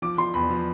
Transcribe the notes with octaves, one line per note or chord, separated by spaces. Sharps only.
F3 D6
F3 C6
E2 B5
F3